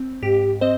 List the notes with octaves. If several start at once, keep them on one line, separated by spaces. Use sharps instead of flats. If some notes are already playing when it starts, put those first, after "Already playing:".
Already playing: C4
G#2 G4
C4 C5 D#5